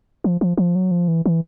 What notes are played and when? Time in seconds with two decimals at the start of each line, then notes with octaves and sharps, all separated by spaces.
0.24 F3
0.41 F3
0.57 F3
0.75 F#3
0.91 F3
1.08 E3
1.26 E3